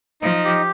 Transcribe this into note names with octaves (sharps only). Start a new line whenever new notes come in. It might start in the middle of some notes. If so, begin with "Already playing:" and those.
F3 D#4
G4